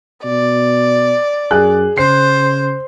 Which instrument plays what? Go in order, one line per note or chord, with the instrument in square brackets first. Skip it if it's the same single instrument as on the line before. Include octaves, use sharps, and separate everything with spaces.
[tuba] B2 [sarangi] D5
[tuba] F#2 [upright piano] G#4 F#6
[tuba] C#3 [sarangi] C5 [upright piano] C7